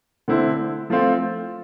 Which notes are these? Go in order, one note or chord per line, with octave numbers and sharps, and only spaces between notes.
D3 A3 C4 E4
F3 A3 C4 F4